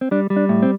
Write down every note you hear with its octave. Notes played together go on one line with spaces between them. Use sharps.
C4
G3 D4
G3
D4
A2
C4